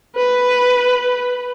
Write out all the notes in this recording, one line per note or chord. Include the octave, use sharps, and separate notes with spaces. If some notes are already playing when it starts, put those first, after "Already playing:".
B4